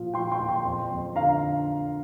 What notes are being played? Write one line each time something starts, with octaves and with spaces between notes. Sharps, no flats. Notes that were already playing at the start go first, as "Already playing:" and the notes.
Already playing: A#2 F3
F3 G5 C6
G5 C6
A#2
G5 C6
F2
F2
D3 F5 A#5